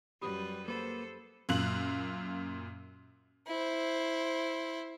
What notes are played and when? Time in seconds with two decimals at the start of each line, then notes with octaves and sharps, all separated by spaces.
0.21 F#2 G3 G4 B4 B5 D#6
0.68 A#3 A4 B4 C5
1.49 F#2 A#2 F5 F#6 F#7
3.47 E4 C5